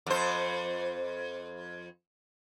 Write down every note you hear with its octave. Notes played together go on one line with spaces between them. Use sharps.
F2 C5